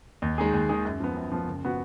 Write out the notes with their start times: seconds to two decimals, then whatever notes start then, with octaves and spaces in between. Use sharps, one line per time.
0.22 D#2
0.38 D#3 G#3 D#4 G#4
0.54 D#2
0.69 D#3 G#3 D#4 G#4
0.85 F#2
1.00 F3 B3
1.16 F#2
1.32 F3 B3
1.47 F#1
1.64 F3 B3 F#4